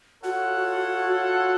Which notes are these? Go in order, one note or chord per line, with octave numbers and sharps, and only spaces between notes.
F4 F#4 A4 C#5 F#5